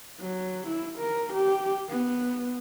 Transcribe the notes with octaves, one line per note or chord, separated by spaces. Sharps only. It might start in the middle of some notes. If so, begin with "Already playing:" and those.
F#3
E4
A#4
G4
B3